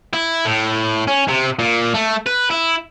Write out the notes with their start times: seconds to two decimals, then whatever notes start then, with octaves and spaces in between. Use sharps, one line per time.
0.13 E4
0.46 A2
1.08 C#4
1.28 C3
1.59 A#2
1.95 A3
2.27 B4
2.51 E4